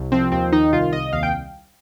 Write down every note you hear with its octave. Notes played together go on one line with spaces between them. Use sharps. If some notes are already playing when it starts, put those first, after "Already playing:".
Already playing: C2
F3 C4
D#2 C4
D#3 D#4
C2 F4
C2 D#5
D#2 F5
G5